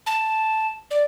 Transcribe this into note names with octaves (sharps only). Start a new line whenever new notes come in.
A5
D5